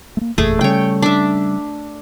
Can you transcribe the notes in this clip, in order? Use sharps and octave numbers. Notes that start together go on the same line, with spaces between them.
A3 A#3
F#1 E2 A#2 A3 G#4
C#3 G3 C#4 C#5 G5
D4 E5